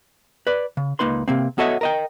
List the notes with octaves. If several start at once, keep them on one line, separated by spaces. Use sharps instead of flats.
B4 D5
C#3
C#2 A#3 D#4 B4 C6
C3 A#3 C4
B3 F#4 A4 C#5 D#5 E5
A#4 D#5 G5